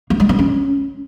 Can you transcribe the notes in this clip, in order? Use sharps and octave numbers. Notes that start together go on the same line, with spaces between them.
A#3
G#3
B3
C#4